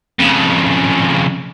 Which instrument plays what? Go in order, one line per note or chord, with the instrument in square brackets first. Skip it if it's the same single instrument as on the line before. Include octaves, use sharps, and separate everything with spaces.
[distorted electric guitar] F2 C#3